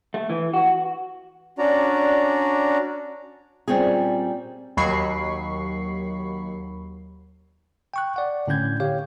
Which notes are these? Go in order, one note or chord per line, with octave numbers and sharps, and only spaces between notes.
A3
E3
F#4
C#4 D4 F#4 D5 A#5
A#2 G3 C4 C#4 G#4
D#2 F#3 B5 C#6 C7
G5 C#6 F#6
D5 F#5
A2 D3 C#4 G6 G#6
G4 C#5 F5